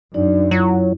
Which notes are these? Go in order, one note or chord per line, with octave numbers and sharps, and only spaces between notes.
F#2 D4 D#4 D5
F#3 E4 F4